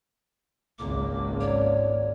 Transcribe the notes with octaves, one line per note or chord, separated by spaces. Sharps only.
G#1 C#2 A#3 D6
C#5 D5